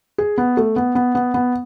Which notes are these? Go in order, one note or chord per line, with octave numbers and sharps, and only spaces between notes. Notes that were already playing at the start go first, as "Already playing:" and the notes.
G#4
B3
A3
B3
B3
B3
B3